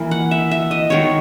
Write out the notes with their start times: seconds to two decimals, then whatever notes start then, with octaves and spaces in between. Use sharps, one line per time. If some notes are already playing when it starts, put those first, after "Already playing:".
Already playing: E3 A#3
0.11 F#5
0.31 E5
0.51 E5
0.71 D#5
0.90 D#3 G#3 B3 C#5